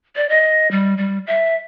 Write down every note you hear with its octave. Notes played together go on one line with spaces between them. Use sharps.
D5
D#5
G3
G3
E5